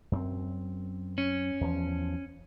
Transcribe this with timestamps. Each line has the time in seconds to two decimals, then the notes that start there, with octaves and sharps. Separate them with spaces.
0.12 F#2 B3 C4
1.18 C#4
1.61 E2 F3